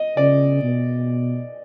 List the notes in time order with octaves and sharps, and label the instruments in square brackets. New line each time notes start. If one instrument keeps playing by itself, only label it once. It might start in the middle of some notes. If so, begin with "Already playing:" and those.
Already playing: [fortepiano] D#5
[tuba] C#3 [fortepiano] D5
[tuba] B2